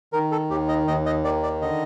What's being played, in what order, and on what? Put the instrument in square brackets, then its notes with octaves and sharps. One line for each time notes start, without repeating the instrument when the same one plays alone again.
[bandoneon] D#3 A#4
A4
D#2 G4
D#5
D#2 D#5
D#5
D#3 D5
D5
D3 D#5